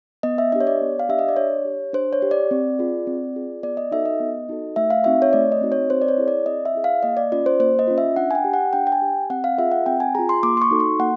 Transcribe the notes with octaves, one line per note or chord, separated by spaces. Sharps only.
B3 D#5
E5
D4 G4 D#5
C#5
D5
B3
F5
D4 G4 E5
D#5
D5
D4 C#5
G4
D4 C5
C#5
G4
D5
C4
F4 G#4
C4
F4 G#4
B3 D5
D#5
D#4 F#4 A4 E5
D#5
B3
D#4 F#4 A4
A3 E5
F5
C4 D#4 F#4 E5
C#5
A3 D5
D#5
C4 D#4 F#4
C#5
C4 C5
D5
C#5
E4 G#4
D5
C4 D#5
E5
E4 G#4
F5
A#3 D#5
D5
C#4 F4 D5
C5
A#3 C5
D#5
C#4 F4
E5
D4 F#5
G#5
G5
G4
F#5
D4 G5
G5
G#5
G4
C4 F#5
F5
F4 G#4 E5
F#5
C4 G5
G#5
F4 G#4 A#5
C6
A#3 D6
C6
C#6
D#4 F#4 A4
C6
A#3 F#5